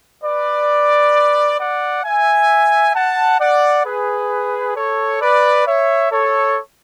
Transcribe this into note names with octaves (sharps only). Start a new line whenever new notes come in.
B4 D5
D5 F#5
E5 G#5
F#5 A5
D5 F#5
G#4 B4
A4 C#5
B4 D5
C#5 E5
A4 C#5